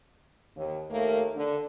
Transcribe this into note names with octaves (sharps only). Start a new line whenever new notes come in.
D#2
D#2 A3 A#3
D3